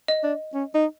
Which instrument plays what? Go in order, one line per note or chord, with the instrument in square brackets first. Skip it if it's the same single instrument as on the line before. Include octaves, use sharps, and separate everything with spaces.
[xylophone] D#5
[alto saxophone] D4
C#4
D#4